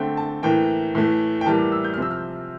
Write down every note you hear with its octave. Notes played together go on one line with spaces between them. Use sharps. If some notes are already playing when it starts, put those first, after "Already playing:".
Already playing: D3 A3 C4 G5
A5
A2 E3 A#3 G5
A2 E3 A3
G5
A2 E3 G3 A#3 A5
D6
E6
G6
F6
C3 F3 C4 E6
F6